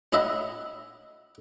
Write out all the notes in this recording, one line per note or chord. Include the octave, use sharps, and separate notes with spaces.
C#4 E4 D#5 E5 F#5 B5